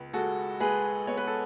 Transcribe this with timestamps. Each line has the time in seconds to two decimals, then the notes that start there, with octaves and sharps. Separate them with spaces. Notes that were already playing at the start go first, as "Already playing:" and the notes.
Already playing: C#2 B3
0.13 G#3 F#4 A4
0.60 G#3 G#4 B4
1.07 B3 C#5
1.17 B4
1.27 A4